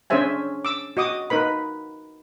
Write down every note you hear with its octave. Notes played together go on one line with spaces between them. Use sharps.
C#4 D4 G#4 C5 E5 G#5
D6 E6
F#4 D#5 D6 D#6
D#4 A#4 B4 B5